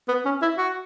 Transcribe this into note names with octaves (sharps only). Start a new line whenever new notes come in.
B3
C#4
E4
F#4